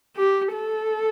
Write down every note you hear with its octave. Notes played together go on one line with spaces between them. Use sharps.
G4
A4